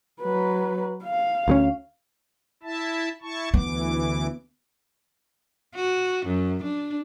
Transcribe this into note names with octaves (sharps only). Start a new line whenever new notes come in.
F#3 B4
F5
D2 G#3 C#4
E4 E5 A5
E4 A5 C#6
D2 E3 B3 D6
F#4
F#2
D4